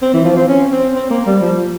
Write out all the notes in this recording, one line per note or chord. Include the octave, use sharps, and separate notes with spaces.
C4
E3
F3
C4
C#4
C4
C4
A#3
G3
F3